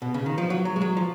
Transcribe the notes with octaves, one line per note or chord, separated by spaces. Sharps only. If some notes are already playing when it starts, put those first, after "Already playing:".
B2
C#3
D#3
F3
F#3
F#3
G#3
F#3
F3